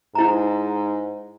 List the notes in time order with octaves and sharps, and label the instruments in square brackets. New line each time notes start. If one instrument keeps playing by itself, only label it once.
[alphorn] G#2 [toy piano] E4 A#5